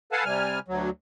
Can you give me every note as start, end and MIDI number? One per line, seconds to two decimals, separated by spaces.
0.12 0.24 69
0.12 0.24 71
0.12 0.24 77
0.12 0.24 78
0.12 0.24 80
0.12 0.24 81
0.25 0.59 48
0.25 0.59 55
0.25 0.59 80
0.25 0.59 89
0.68 0.90 38
0.68 0.90 54